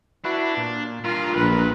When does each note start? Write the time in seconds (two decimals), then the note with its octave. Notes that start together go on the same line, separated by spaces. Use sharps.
0.25 D4 E4 F#4 B4
0.57 A#2
1.04 G2 A#2 F4 A#4
1.36 A#1 B4